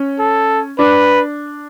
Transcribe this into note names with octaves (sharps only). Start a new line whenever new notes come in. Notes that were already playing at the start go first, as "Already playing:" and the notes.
Already playing: C#4
A4
D4 B4